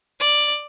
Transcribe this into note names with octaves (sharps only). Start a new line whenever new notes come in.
D5